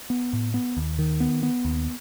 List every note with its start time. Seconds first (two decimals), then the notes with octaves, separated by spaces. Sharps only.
0.10 B3
0.33 A2
0.54 B3
0.77 D#2
0.99 D#3
1.20 B3
1.43 B3
1.65 D#2